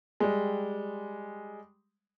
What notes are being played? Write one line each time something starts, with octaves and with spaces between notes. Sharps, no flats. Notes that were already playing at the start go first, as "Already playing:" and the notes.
G3 G#3